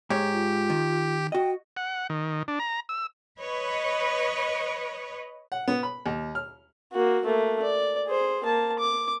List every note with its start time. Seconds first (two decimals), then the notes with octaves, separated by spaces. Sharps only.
0.10 G#2 G4 C#5
0.33 F4
0.70 D#3
1.32 F#4 D#5 G5
1.77 F#5
2.10 D#3
2.48 D4
2.60 A#5
2.89 E6
3.39 B4 C#5 D#5
5.52 F#5
5.68 B3
5.83 B5
6.06 D#2
6.35 F6
6.93 A#3 F#4
7.25 A3 A#3
7.62 D5
8.07 G#4 C5
8.44 A#3 A5
8.79 D6